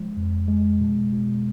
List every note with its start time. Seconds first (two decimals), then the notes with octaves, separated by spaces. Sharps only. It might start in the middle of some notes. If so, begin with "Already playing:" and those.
Already playing: F3 G#3
0.17 F2
0.48 G#3
0.80 B2
1.13 B2